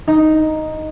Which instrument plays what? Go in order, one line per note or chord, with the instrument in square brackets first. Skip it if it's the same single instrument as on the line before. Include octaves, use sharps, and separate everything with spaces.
[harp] D#4